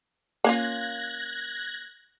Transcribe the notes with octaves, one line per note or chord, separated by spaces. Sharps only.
A#3 C#4 F4 F#6 G#6 A#6